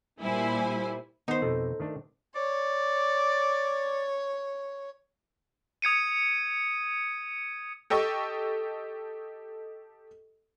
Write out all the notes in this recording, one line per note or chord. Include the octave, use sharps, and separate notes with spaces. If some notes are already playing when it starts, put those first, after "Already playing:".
A#2 G3 E4 C5 G#5 B5
D#3 B3 D#4 C5
F2 B2 A4
D#3 A3 D4
C#5 D5
D#6 G#6 C#7 D#7
G4 A4 D#5 C#6